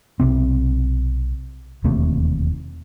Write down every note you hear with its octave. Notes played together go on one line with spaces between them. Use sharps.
B1 C3 C4
E1 D#2 C3 A3